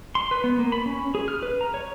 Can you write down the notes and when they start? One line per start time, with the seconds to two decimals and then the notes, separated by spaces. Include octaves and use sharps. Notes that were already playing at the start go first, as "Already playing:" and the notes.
0.15 C6
0.31 B4
0.44 B3
0.59 A#3
0.72 B5
0.86 C#4
1.15 G#4
1.28 F6
1.43 B4
1.61 A#5
1.74 C#5